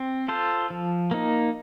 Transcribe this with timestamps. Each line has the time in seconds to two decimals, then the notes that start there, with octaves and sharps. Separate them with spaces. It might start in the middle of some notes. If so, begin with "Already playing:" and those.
Already playing: C4
0.28 F4 A4 C5
0.70 F3
1.11 A#3 D#4